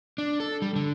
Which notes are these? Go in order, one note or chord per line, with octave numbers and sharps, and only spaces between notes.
D4
A4
G3
D3